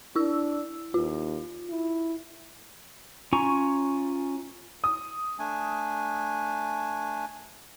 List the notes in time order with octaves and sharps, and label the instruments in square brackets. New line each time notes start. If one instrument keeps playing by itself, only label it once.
[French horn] D4 [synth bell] E4 E6
[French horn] D#2 [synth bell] F4
[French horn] E4
[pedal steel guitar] C#4 F4 G#5 A#5 C#6
[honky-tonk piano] D#6
[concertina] A3 D4 G#5